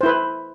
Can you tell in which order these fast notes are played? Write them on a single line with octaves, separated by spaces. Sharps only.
C5 E4 B4